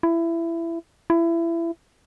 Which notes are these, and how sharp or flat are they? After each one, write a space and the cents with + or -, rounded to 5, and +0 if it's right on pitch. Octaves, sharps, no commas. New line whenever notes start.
E4 +20
E4 +25